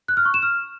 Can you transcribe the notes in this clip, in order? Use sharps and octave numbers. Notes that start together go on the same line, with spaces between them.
F#6
F6
C#6
E7
F6